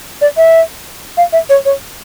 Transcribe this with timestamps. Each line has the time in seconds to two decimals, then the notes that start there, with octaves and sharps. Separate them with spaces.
0.21 D5
0.37 E5
1.17 F5
1.33 E5
1.49 C#5
1.65 C#5